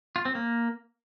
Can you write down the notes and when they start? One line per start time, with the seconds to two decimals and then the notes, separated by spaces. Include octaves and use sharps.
0.16 F4
0.25 C4
0.35 A#3